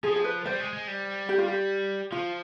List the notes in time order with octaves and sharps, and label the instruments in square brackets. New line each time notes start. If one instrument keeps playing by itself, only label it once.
[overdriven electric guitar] F3 [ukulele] G#4
[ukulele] G#4
B4
[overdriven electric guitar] G3 [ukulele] C5
[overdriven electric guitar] G#3
G#3
G3
[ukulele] G4
F4
G4
[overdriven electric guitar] F3 [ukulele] F4